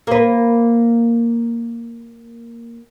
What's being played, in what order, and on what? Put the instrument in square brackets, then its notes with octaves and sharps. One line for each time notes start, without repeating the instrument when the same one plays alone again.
[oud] A#3 B4